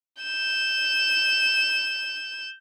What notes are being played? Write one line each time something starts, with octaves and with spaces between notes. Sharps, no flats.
G6 E7